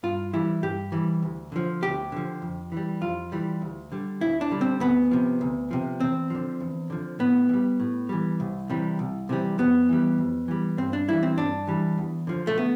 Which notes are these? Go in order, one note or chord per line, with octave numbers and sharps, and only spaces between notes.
G2 F4
E3 G3 E4
G2 G4
E3 G3
D2
D3 F3
D2 G4
D3 F3
F2
E3 G3
F2 F4
E3 G3
D2
D3 G3
D2 E4
D4
D3 G3
C4
D2 B3
C3 F3
D2
C3 F3
E2 C4
D3 F3
E2
D3 F3
A2 B3
E3
G3
A2
E3 G3
C2
C3 E3 G3
C2
C3 E3 G3
F2 B3
E3 G3
F2
E3 G3
G2 C4
D4
E3 G3 E4
C4
G2 D4
E3 G3
E2
D3 F3
A3
B3